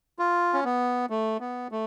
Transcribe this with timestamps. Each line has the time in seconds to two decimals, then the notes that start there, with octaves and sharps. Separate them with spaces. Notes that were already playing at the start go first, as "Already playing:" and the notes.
0.19 F4
0.53 C#4
0.65 B3
1.10 A3
1.40 B3
1.72 A3